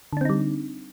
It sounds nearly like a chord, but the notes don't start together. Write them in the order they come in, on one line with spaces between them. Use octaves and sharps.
D3 D4 C4 D#4 G3